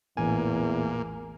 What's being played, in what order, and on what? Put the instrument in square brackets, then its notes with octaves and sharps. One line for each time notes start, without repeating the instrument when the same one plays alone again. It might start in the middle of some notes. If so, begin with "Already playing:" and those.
[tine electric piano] A1 G#5 [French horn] E2 [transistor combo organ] A#2